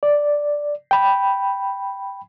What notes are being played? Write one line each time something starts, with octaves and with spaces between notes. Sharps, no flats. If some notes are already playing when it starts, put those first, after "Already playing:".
D5
G5 B5